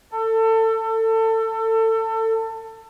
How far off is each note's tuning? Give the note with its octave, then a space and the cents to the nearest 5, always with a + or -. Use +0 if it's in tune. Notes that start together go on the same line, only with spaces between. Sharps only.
A4 +25